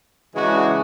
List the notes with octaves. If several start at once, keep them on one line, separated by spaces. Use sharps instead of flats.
C#3 E3 G#3 D4 F#4